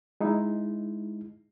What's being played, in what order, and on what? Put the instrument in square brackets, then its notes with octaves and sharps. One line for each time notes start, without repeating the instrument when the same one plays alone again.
[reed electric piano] G#3 D#4 E4